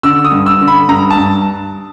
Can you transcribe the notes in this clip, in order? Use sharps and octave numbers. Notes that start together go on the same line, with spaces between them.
D3 E6
D#6
G2
E6
D3
B5
G2 A#5
A5
G2